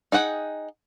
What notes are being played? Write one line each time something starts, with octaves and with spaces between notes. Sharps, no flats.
D#4 G#4 F#5 G5